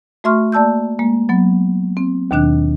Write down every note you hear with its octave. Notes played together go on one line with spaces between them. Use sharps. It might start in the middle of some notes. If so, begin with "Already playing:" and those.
A3 F#4 E5 C6 C#6 F6
A#3 D5 A5 E6 G6
G#3 A#3
F#3 B3
C4
D#2 B2 D#3 D4 F#6